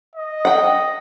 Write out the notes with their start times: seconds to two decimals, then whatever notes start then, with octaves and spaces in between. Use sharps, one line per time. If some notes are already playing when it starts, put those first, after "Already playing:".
0.16 D#5
0.45 F#5 G5